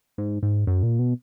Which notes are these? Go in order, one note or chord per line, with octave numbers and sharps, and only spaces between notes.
G#2
G#2
F#2
A#2
B2